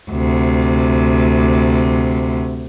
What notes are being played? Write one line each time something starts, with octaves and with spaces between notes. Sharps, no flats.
D2 C3